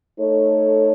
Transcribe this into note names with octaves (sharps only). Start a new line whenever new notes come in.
A3 D#4 A4 C#5